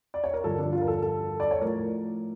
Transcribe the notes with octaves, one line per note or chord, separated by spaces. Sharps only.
D5
C#5
A#4
G2 D3 F3 A4
D4
F4
A#4
A4
A4
D5
C#5
A2 F3 A#4